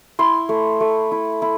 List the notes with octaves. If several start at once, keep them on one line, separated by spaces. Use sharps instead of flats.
E4 C6
A3
A3
E4
E4